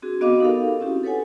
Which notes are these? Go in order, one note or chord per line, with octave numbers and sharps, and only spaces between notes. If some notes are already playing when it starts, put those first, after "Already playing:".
C4 D4 F#4 G#4
B3 F#4 D#5 F5 B5 D6
D#4 G4 A4 A#4 F5
C4 C#4 E4 F#4 G4
A4 B4 C#5 F#5 G#5